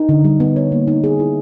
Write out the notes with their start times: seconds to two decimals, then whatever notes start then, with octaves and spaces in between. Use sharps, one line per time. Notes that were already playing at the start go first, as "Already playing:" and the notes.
Already playing: D#4
0.09 D3
0.24 G3
0.40 B3
0.56 C#5
0.72 A#3
0.87 D#4
1.04 G#4
1.19 E4